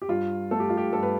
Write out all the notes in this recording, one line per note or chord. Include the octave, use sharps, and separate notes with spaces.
G4
G2 F4
A3 A4
G4
F4
G4
G2 A4
B4